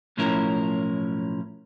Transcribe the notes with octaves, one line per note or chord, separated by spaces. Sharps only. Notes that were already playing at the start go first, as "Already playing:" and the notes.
B1 A2 F3 C#4 E4 A#4